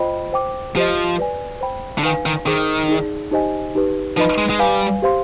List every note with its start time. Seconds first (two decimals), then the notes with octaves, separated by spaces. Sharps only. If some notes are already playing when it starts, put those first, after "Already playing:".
Already playing: F4 C5 D#5 G5 B5
0.33 C5 G5 D6
0.76 F3 G4 C5 D#5
1.18 B4 D5 G#5
1.61 C5 G5 B5
1.98 D3
2.03 D#3 D#4 B4 F5 G#5
2.26 D#3
2.46 D#3 G#4 C5 G5 D6
2.89 D#4 G#4 D5
3.31 D#4 G4 C5 D#5 G#5
3.75 D#4 G4 B4
4.17 F3 D#4 B4 D#5 B5
4.38 G#3
4.50 G#3
4.59 G3 B4 F5 G#5
5.02 G4 C5 F5 C6